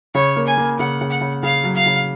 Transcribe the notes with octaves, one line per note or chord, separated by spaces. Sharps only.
C#3 C#5
A#3
G#5
A#3
C#3 F#5
C#3
F#5
C#3
C#3 F5
F#3
F5
C#3